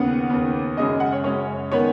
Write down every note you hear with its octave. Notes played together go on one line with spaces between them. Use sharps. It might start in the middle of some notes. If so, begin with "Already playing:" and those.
Already playing: D#2 C#3 B3 F#5
D#2 C#3 B3
F#2 C#3 G#3 C#4 D#5
F#5
C#5
F#2 C#3 G#3 C#4 C#5
D#3 B3 C#5